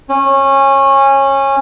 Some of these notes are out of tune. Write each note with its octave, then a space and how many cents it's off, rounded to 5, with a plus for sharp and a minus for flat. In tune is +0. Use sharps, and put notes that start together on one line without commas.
C#4 -20